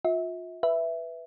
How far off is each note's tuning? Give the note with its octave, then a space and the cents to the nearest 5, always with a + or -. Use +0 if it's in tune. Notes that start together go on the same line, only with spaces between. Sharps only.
F4 +30 E5 -35
B4 +0 E5 +0